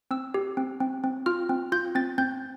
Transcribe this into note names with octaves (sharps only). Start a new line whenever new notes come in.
C4 E6
G4
C4
C4
C4
F4 F6
C4
F4 G6
C4 A6
C4 G6